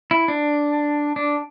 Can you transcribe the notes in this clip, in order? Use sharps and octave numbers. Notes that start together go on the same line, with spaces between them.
E4
D4
D4